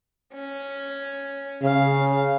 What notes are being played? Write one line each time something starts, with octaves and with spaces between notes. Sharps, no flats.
C#4
C#3 F5